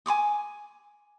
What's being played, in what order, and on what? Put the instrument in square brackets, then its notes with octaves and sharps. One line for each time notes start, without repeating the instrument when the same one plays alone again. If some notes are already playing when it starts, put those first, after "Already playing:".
[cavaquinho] G#5 C6 D6 D#6